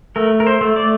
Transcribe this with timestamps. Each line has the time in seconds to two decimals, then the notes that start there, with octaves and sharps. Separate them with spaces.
0.16 A3 A#4
0.40 A#4
0.47 C5
0.61 A3
0.76 D5